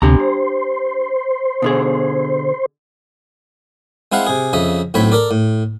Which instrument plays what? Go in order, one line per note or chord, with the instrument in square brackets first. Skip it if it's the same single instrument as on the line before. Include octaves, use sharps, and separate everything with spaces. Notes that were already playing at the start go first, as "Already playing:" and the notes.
[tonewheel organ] D2 C3 [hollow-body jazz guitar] D4 G4 A#5
[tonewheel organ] C5
[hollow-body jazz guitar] B2 D3 G#4
[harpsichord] G#3 C4 E4 F5 F#5
C3 G#4
F2 C#3 D#5 E5
B1 A2 C4 C#5 B5
A4 A#4 D5
A2